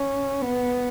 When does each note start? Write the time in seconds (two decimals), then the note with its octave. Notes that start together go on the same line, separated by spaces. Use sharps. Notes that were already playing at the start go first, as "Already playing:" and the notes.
Already playing: C#4
0.42 B3